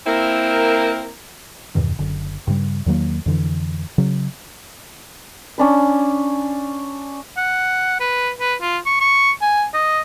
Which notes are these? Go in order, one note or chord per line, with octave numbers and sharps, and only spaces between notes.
A#3 C4 E4 A#4
E2 G2 B2 D#3
F#1 D3
G2 C#3 G3
E2 D#3 F#3 A#3
F2 D3 E3
C#3 F#3
C#4 D4 B5
F#5
B4
B4
F4
C#6
C#6
G#5
D#5